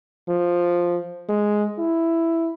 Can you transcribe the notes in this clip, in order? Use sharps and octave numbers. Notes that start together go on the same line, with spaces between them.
F3
G#3
E4